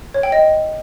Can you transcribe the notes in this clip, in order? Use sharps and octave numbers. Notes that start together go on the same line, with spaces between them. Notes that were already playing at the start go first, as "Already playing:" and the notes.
C#5
G5
D#5